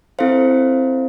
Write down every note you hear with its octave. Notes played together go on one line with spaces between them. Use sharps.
C4 E4 A4 C5 F5